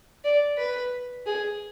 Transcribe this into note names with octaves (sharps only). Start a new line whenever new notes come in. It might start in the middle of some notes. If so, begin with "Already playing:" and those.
D5
B4
G#4